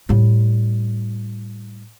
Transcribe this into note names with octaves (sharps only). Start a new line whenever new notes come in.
A2 G3